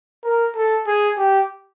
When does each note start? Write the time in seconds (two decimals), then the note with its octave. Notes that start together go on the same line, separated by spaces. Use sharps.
0.24 A#4
0.56 A4
0.87 G#4
1.18 G4